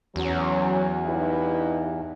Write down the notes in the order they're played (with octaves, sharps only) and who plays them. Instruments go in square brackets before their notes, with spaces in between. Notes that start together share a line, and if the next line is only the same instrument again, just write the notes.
[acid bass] E2 [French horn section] F#3 C#4
[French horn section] G2 D#4 E4